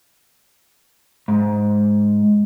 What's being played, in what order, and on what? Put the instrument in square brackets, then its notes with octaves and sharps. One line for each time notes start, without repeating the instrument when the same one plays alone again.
[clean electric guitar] G#2